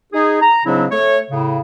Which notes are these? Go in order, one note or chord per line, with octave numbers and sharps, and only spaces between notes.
D#4 G#4
A#5
G#2 C#3 F#3 C4 D4 E4
A3 C#5
A2 C#3